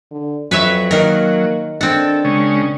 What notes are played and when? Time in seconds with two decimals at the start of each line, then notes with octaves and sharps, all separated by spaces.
0.11 D3
0.51 F2 F#3 B4 C#5 E5
0.91 D#3 A#3 A#4
1.81 C4 D4 A4 F#5
2.25 C#3 G#3 C#4